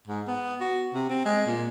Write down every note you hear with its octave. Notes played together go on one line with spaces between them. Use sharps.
G#2
B3
F#4
C3
C4
G#3
A#2